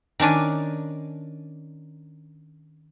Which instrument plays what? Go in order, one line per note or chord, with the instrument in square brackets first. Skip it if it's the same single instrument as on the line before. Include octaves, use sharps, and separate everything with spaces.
[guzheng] D#3 C#4 D4 G#5